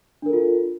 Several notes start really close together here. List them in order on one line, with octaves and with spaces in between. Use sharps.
D4 A#4 A4 F4